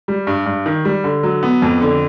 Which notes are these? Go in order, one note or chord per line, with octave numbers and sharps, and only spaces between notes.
G3
G2
G2
D#3
G3
D3
F#3
B3
F2
D3